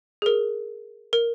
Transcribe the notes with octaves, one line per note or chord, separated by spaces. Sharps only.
G#4
A#4
A#4